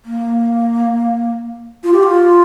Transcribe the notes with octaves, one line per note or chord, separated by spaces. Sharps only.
A#3
F4
G4
F4